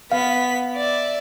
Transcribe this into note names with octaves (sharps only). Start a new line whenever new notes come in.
B3 F5 B6
D5 E5